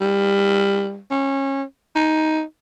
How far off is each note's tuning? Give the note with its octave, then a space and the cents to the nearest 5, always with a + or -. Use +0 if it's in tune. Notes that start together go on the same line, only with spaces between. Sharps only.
G3 +25
C#4 -25
D#4 +10